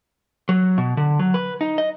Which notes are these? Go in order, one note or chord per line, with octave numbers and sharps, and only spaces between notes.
F#3
B2
D3
F#3
B4
D#4
D#5